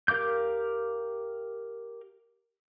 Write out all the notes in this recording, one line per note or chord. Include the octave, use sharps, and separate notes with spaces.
G4 A#4 F5 D6 G6